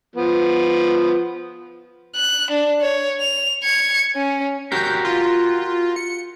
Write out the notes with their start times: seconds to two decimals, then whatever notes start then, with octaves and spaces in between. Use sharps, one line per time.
0.16 F3 B3
2.16 F#6
2.51 D4
2.81 C#5
3.20 F7
3.64 G#6 C#7
4.16 C#4
4.72 F#4 G4 A#4 G6
5.05 F4
5.96 C#7